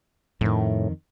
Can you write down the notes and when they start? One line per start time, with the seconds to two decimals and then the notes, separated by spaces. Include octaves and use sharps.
0.41 F2 A2 D#3